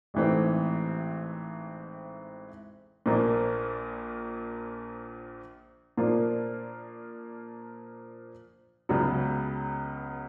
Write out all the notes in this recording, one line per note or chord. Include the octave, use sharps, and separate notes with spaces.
A1 G#2 E3 A3 C4
A#1 A#2 F3 A#3
A#2 F3 A#3 D4 F4
C#2 C#3 F#3 B3